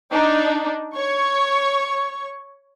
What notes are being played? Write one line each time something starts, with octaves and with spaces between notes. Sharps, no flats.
D4 D#4
C#5 C#6